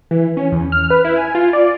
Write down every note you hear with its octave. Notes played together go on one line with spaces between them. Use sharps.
E3
C#4
E2
F6
B4
E4
G#5
F4
D5